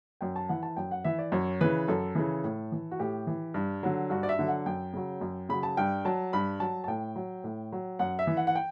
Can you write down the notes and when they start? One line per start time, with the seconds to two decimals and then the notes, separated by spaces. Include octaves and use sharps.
0.21 F#2 G5
0.36 A5
0.49 E3 F#5
0.63 A5
0.77 F#2 G5
0.91 F#5
1.04 E3 E5
1.18 D5
1.32 F#2 C#5
1.61 C#3 E3 B4
1.88 F#2 A4
2.15 C#3 E3
2.44 A2
2.72 E3
2.91 F#4
2.99 A2 G4
3.27 E3
3.54 G2
3.83 D3 F#3
4.10 G2 F#4
4.23 D5
4.29 E5
4.39 D3 F#3
4.48 F#5
4.66 F#2 G5
4.93 C#3 F#3
5.21 F#2
5.49 C#3 F#3 B5
5.63 A5
5.77 G2 G5
6.05 F#3 A5
6.33 G2 B5
6.60 F#3 A5
6.84 A5
6.88 A2 G5
7.16 F#3
7.44 A2
7.72 F#3
7.99 F#2 F#5
8.19 E5
8.27 E3
8.37 F#5
8.47 F#5
8.55 G5